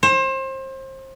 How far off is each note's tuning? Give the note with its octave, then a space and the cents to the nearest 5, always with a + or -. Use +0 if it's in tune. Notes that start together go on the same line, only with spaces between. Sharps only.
C5 +30